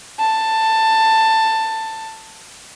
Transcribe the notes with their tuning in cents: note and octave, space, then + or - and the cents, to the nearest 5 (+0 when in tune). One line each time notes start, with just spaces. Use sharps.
A5 +15